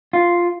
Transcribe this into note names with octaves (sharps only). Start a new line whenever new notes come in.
F4